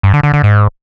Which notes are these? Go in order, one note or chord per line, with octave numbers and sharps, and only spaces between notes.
G2
D3
D3
D3
G#2